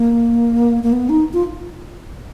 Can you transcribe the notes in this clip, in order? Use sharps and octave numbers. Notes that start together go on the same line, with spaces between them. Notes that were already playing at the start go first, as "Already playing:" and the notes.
Already playing: A#3
A#3
B3
D#4
F4